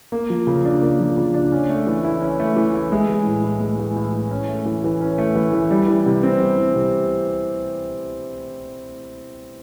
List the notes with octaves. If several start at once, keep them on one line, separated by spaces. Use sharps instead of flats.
A#3
F3
C#3
D4
A#3
F3
C#3
D4
C#4
A3
E3
E4
C#4
A3
E3
E4
G#3
E3
A2
A2
G#3
E3
A2
A2
C#4
A3
E3
E3
C#4
A3
E3
E3
G3
E3
C3
C4
G3
E3
C3